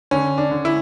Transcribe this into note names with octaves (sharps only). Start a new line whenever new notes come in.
D3 C#4
D4
D3
E4